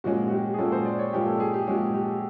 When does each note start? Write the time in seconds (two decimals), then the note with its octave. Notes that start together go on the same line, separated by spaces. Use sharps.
0.04 A#2 F3 G#3 C#4 F#4
0.28 F#4
0.31 G4
0.54 G#4
0.58 A#2 F3 G#3 C#4 A4
0.72 C5
0.85 D5
0.99 C#5
1.13 A#2 F3 G#3 C#4 G4
1.26 A4
1.40 G#4
1.54 G4
1.67 A#2 F3 G#3 C#4 F#4
1.94 G4